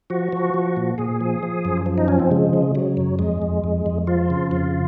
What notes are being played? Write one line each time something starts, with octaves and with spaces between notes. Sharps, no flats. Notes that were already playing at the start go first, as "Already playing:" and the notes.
F3 F#4
F3
F3
A#2
A#2 G#4
F3
F3
F#2
F3
D#4
F3 C#4
C4
C#3 G#3
C#3
C#3 F#3
F#2
F2 G#3
F2
F2
F2
F3 F4
C#3
F2 F4